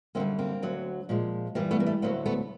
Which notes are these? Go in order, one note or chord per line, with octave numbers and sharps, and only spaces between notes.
F#2 D3 G3 A#3 C4
A#3 C4
D2 D3 F#3
A#2 F3 G#3
G2 E3 G3 A#3
A3 B3
A#3
A3
D2 D3 F#3 A3 A#3
A3 B3